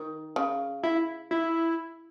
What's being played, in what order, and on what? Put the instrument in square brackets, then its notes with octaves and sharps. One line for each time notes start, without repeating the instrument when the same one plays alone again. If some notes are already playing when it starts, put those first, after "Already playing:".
Already playing: [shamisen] D#3
C#3
[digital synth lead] E4
E4